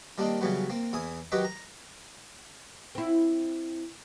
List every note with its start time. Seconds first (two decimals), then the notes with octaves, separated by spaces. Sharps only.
0.18 D#3 G3 A#3 C4 D4 D#4
0.41 C#3 E3 F#3 G3 B3
0.70 A#3 C4
0.93 E2 E4 G#5 D#6
1.32 D#3 F#3 G4 B4 D#5 G5
1.45 A#5
2.95 C4 E4